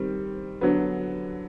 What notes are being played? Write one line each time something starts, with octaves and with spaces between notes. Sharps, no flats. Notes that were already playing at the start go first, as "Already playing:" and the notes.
Already playing: D#3 G3 C4
D3 F#3 B3